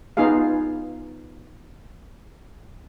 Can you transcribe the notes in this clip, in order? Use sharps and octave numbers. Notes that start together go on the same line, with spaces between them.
B3 D#4 F4 G#4 F5